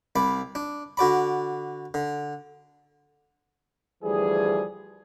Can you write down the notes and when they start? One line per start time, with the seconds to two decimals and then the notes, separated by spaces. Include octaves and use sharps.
0.16 C2 D5 B5
0.55 D4
0.97 D3 F#4 D5 B5
1.94 D3
4.03 D2 E3 F3 G3 G#4